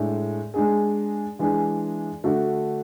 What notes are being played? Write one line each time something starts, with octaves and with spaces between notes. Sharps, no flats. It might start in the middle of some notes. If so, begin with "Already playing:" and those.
Already playing: A2 G#3 D4
G#3 D4 G#4
E3 G#3 D4 G#4
D3 A3 D4 F#4